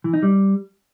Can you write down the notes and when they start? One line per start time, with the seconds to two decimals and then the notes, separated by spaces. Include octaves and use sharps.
0.04 E3
0.13 D#4
0.23 G3